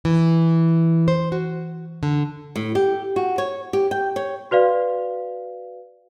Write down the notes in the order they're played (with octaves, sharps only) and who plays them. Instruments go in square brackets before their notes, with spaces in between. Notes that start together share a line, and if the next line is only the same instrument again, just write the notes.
[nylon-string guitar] E3
C5
F#4
D3
A2
G4
F#4
C#5
G4
G5
C#5
[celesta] F#4 B4 D5 F5